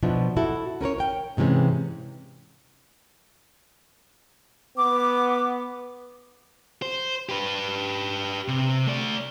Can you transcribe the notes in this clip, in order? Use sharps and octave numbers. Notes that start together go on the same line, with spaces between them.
B2 F3 B3 D4 E4
E4 F#4 A4
C#4 A#4 B4 C#5
A#4 G5
G#2 C3 E3 G#3 C#4
B3 D6
C5
G4 B4
C3
A3 D5